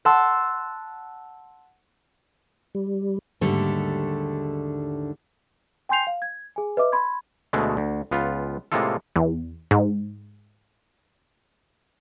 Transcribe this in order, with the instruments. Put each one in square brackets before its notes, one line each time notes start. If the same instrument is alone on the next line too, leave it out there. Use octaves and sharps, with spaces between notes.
[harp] F#5 A5 C6 E6
[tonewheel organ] G3
[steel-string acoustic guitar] D#2 G#2 D3 G3 A3
[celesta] G5 G#5 C6 G6 C7 F7
F5
G#6
G#4 G#5
B4 D#5 E5 D6
B5 C6 G#6
[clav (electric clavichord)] D2 B2 G#3 A3
D2
C#2 B3 F4
A2 C3 G#3 A#3 F4 A4
[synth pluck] E2
G#2